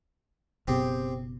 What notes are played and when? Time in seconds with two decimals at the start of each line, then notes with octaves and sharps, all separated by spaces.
0.68 F#1 B2 C4 G4 G#4